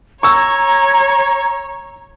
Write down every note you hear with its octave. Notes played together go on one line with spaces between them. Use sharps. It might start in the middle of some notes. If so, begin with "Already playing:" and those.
C#5 A#5 C#6 E6 G#6